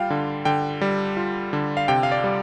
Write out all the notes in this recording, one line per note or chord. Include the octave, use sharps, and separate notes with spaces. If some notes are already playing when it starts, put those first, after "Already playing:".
Already playing: G3 F4 F5 G5
D3
D3 G5
G3
F4
D3
F5
C3 G5
F5
D5
G3